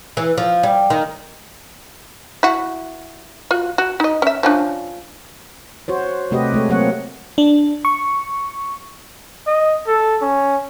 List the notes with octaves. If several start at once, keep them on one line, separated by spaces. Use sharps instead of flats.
E3
F3
G3
D#3
E4 F#4
F4 F#4
F#4
D#4 D#5
C#4 E5
F3 C#4 D4
F#4 C5 C#5
C3 A3 F#4 G4 B4 D#5
G#3 A3 C#5
F#3 A3 A#3 C4 C#5 F#5
D4
C#6
D#5
A4
C#4